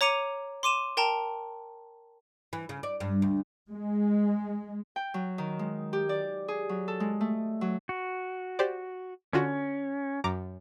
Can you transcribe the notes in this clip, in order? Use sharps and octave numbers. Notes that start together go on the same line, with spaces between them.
C#5 A#5 D6 C#7 D#7 F7
C6 D6 D#7 E7
A#4 G5 A5 A#5
E3
C#3
D5
G2
D2
G#3
G5
F#3
D#3
G#3
G4
D5
G#4
F#3
A4
G#3
A3
F#3
F#4
G4 C5 D5
D3 C#4 F4 F#4
F#2 A#5 D6